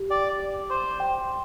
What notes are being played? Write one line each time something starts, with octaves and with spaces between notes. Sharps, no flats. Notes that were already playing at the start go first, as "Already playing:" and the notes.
Already playing: G4
D5 G5
D5
C5 D6
G5